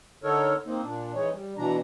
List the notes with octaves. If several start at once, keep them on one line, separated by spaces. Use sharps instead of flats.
D3 D#4 A4 A#4 C#5
A#3 C4 D#4
A#2 D4
E3 G#3 D#4 C#5
G3
B2 E3 D4 A#5